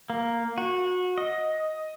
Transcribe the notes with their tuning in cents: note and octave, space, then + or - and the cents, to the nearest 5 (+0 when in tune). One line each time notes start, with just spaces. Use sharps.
A#3 +0
F#4 -25
D#5 +10